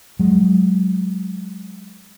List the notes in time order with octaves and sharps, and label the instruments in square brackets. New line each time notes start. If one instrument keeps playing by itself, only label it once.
[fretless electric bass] F#3 G#3